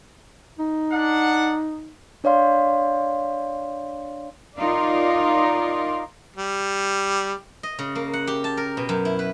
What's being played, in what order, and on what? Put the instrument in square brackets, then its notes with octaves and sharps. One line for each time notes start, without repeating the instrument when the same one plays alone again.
[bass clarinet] D#4
[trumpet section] D4 F#5
[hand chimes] D4 C#5 D5 F5 C6
[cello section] D#4 F4 A#4 D5
[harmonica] G3
[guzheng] D#5
C#3
A#3
F#5
G4
A5
A#4
B2
F#2
E4
B4